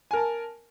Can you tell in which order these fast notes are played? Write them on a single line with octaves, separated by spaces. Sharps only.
G#5 A#4 A5